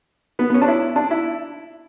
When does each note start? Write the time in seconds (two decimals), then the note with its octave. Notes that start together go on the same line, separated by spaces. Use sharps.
0.39 B3
0.50 B3
0.54 C#4
0.62 D4
0.68 E4
0.96 D4
1.11 E4